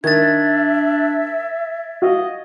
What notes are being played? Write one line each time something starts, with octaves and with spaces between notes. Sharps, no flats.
D#3 D4 E5 G#6 A6
F#4 D#5 F5